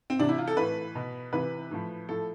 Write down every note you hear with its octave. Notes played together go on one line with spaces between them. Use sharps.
C4
C3 E3 D4
E4
F4
A4
A2 E3 B4
B2
C3 E3 B4
A2 F3
A2 F3 A4